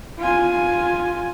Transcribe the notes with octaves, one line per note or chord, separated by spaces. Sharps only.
F4 G#5